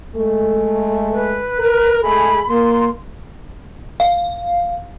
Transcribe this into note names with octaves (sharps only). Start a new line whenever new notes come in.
G#3 A3
B4
A#4
G#3 A3 G#4 B5
A#3 C6
F5